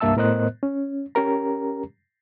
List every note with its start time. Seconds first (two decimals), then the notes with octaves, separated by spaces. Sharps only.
0.01 C2 G2 A#3 E5 A5 E6
0.17 A2 B3 A#4 C5 D#5 F#6
0.63 C#4
1.15 C#4 G4 A#4 A#5